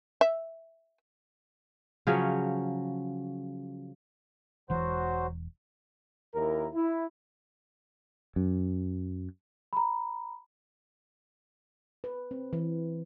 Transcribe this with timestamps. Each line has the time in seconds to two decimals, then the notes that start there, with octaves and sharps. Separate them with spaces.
0.21 E5
2.07 C#3 F3 F#3 C#4
4.70 E1 E3 F#3 F#4 C5
6.35 D#2 E4 A#4
6.74 E4
8.36 F#2
9.73 A#5 B5
12.04 B4
12.31 C4
12.53 E3